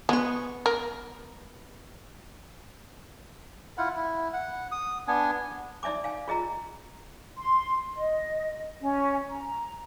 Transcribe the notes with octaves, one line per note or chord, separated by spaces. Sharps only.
G#3 B3 C#6
A#4
E4 F4 F#5
E4
F#5
D#6
B3 D4 G#5
D#4 D5 E5 G#5 D6
F5 G#5
F4 G#4 D#5 A#5
C6
D#5
C#4
A#5